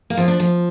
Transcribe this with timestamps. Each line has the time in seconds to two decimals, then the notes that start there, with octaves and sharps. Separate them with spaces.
0.10 A#3
0.17 F3 C4
0.28 D4
0.40 F3